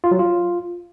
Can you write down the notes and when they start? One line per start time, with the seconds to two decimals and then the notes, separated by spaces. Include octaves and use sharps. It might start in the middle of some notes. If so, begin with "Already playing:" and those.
0.04 F4
0.11 F#3
0.19 F4